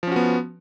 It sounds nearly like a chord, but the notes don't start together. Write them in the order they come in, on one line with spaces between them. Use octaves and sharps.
F3 C#4 F#4 B3